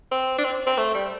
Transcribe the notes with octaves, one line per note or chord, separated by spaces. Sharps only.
C4
D4
C4
C4
A3
G3